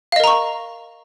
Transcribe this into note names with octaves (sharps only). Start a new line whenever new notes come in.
A#4 D#5 F5 A#5 C#6